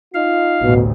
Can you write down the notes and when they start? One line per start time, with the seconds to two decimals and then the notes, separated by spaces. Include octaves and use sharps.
0.14 D#4 F4 F5
0.63 A1 D2 B2